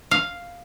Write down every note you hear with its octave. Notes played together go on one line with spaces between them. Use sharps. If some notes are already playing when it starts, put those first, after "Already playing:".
F5